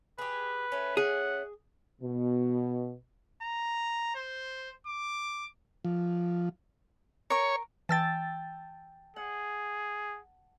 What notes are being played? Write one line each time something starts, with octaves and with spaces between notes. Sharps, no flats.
G4 G#4 B4
A3 C#4
G#4 F#5
B2
A#5
C5
D6
F3
A#4 C#5 C#6
E3 G5 A5 E6 A6
G#4 F#5